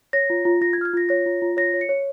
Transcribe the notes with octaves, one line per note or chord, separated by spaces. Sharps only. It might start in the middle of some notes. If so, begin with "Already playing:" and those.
C#5 A#6
F4
F4
F4 A#6
G#6
F4 F6
G#6
F4 A#6
C#5 A#6
F4
F4
C#5 A#6
C#5
C#7
C#5